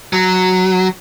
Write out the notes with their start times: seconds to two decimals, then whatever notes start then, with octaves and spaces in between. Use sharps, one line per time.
0.13 F#3